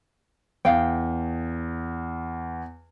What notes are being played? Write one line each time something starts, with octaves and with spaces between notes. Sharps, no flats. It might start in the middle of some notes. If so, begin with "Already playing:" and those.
E2 F5 G5